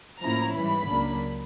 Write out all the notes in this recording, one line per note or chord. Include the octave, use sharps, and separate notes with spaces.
A2 F3 A#3 C#4 E4 A#5
G#2 E3 G3 B5
C#2 C#3 F#3 A#3 D4